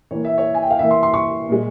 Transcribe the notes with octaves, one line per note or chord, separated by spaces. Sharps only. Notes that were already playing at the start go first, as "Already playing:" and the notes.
E3 A#3 C#5
E5
C#5
G#5
G5
F5
E3 A#3 E5
C6
C6
C#6
A#2 G#3